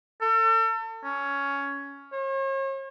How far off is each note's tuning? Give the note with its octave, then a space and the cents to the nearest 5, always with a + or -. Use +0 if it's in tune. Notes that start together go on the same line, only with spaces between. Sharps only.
A4 +35
C#4 +10
C#5 -40